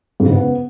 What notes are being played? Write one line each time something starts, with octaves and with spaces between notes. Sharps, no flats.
G#2
C#3
B3